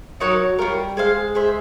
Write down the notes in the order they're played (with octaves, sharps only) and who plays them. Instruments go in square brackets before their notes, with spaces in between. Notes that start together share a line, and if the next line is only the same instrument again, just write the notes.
[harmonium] F#3 [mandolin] D#4 F#4 A#4 C#5
[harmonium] F#3
[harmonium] G3 [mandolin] C#4 F4 A#4
[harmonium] G#3 [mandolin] G#4 C5 F5
[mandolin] G#4 C5 E5